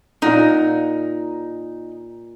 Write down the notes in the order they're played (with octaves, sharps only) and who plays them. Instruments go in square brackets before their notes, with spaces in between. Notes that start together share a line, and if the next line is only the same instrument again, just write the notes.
[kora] A#2 A#4 F#5 [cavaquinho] D#4